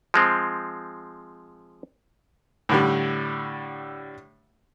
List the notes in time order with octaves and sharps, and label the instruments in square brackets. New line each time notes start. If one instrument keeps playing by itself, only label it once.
[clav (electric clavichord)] F3 G#3 C4
[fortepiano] A2 D3 G3